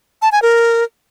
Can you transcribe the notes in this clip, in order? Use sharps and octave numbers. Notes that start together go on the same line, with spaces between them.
A5
G#5
A#4